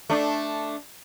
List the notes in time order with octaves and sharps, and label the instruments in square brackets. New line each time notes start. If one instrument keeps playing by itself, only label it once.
[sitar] A3 D4